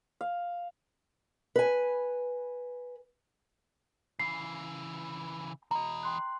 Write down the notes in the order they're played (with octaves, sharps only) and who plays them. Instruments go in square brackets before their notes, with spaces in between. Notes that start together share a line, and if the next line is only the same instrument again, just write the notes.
[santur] F5
[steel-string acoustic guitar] B4 G#5
[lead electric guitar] C#3 E3 [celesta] C7
[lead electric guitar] E3 D#5 [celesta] A#5
[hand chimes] G5 C6 F#6